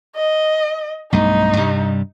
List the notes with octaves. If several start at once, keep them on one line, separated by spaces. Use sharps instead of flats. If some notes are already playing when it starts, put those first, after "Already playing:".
D#5
B1 G2 A3 D#4
G2 C3 G3